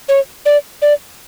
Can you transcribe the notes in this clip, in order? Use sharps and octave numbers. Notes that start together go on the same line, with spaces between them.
C#5
D5
D5